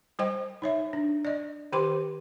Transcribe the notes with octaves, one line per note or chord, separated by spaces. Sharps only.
G3 C5 D#5 G5
D#4 C#5 E5
D4
D5 D#5
D#3 G4 C5 G5 C6 D6